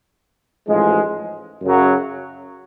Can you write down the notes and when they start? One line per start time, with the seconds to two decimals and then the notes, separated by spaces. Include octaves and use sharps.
0.68 A1 G#2 F3 G#3
1.62 F#2 C#3 F#3